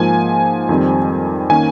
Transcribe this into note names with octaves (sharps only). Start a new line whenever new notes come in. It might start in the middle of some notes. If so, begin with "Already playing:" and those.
Already playing: G#2 F3 A#3 G#5
F2 D#3 G3 C4
D#3 A#3 C#4 G#5